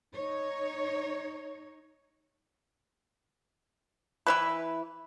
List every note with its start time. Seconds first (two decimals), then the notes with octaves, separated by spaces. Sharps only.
0.15 D#4 C#5
4.27 E3 E4 B4